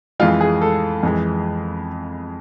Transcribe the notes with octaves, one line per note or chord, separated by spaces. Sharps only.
F2 E3 G#3 F4
G#4
A4
F2 E3 G#3